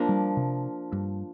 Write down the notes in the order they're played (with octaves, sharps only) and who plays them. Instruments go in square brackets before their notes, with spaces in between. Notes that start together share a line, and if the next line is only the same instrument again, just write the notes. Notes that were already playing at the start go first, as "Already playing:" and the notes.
Already playing: [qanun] F3 A#3 D4
[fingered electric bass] G3
C3
G2